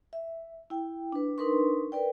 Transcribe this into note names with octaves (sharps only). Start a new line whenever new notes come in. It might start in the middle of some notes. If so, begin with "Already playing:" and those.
E5
E4 G5
D4 B4
D4 D#4 A#4 B4 C6 C#6
A#4 B4 D5 G5